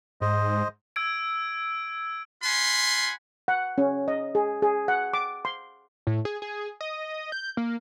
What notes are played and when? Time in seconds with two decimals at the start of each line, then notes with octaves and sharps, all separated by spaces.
0.21 G#2 C5 D#5
0.96 E6 G#6 D7
2.43 F4 F#5 G#5 B5 C6
3.48 F#5
3.78 C#4
4.08 D#5
4.35 G#4
4.62 G#4
4.88 F#5
5.14 D6
5.45 C6
6.07 A2
6.25 G#4
6.42 G#4
6.81 D#5
7.32 G6
7.57 A#3